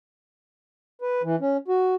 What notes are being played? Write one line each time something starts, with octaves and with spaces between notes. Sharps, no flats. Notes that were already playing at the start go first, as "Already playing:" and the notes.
B4
E3
C#4
F#4